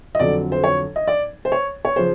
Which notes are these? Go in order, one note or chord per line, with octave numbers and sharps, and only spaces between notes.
D#5
F2 D3 F#3 D5
C5
C#5
D#5
D5
C5
C#5
C#5
C#3 F3 C5